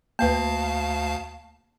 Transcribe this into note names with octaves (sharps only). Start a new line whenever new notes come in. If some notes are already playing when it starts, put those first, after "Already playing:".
D2 A#3 B4 F5 A5